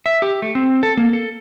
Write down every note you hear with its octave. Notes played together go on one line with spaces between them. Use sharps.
E5
G4
A3
C4
A4
A#3
A4